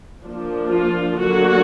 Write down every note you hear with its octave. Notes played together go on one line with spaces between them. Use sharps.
F3 A#3 D4
F4
D3 F#3 A#3 F#4